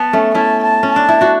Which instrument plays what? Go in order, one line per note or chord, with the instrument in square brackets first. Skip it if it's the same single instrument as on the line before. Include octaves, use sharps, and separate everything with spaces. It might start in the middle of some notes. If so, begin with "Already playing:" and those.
Already playing: [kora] B3 [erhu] A5
[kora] A3 C#4
[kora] C#4 E4 [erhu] A5
[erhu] A5
[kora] C#4
[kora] D4 [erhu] A5
[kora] E4
D4 F#4